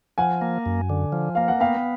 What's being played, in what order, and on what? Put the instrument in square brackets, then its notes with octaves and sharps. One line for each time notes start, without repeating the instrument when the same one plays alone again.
[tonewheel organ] F3 [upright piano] F#5 G#5
[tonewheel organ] A#3
F#2
D3
F3
[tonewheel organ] A#3 [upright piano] F5
[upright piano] F#5
[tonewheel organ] B3 [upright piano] F5 G5